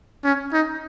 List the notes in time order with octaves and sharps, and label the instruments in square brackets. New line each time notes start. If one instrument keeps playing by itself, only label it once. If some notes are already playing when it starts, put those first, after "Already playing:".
[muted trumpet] C#4
D#4